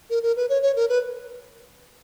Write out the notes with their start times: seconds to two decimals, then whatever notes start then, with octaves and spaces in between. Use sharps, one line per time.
0.10 A#4
0.23 A#4
0.37 B4
0.49 C#5
0.62 C#5
0.76 A#4
0.89 B4